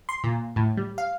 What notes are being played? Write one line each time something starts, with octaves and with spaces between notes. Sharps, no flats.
C6
A#2
A2
G3
F5